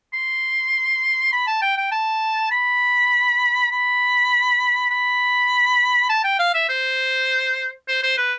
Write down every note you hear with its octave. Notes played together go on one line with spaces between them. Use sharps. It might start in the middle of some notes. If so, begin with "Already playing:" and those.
C6
B5
A5
G5
G5
A5
B5
B5
B5
A5
G5
F5
E5
C5
C5
C5
B4